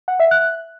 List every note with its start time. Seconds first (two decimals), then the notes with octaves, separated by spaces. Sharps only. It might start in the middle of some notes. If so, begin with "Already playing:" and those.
0.08 F#5
0.20 E5
0.31 F#6